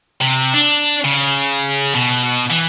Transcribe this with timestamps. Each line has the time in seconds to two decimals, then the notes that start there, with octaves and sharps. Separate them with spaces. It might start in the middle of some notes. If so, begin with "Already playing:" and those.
0.21 C3
0.53 D4
1.04 C#3
1.95 B2
2.50 E3